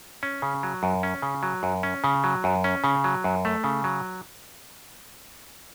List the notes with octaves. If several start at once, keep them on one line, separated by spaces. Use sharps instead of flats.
C#4
C#3
F#3
F#2
C#4
C#3
F#3
F#2
C#4
C#3
F#3
F#2
C#4
C#3
F#3
F#2
A3
C#3
F#3